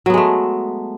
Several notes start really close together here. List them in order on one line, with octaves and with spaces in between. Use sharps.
F#3 B3 G#3 A3